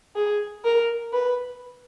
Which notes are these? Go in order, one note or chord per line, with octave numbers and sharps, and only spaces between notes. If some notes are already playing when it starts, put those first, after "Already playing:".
G#4
A#4
B4